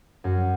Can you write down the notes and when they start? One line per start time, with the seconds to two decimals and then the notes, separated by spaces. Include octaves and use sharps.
0.24 F#2